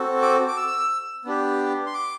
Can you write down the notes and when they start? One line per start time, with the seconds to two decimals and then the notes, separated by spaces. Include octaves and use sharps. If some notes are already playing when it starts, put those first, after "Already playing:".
Already playing: C4 F#4 A4
0.22 D6
0.48 D6
0.57 E6
1.25 B3 D4 G4
1.86 C6
1.94 D6